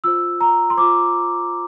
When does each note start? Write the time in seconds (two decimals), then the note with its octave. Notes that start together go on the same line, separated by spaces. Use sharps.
0.04 F4 C5 E6
0.41 A#5
0.70 C6
0.77 F4 C5 D6